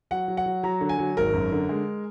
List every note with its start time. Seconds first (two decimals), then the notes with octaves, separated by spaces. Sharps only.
0.11 F#3 F#5
0.28 F#3
0.37 F#5
0.46 F#3
0.63 F#3 A#5
0.81 D3
0.89 G#5
0.98 F#3
1.17 G#1 A#4
1.33 F#2
1.52 D3
1.69 G#3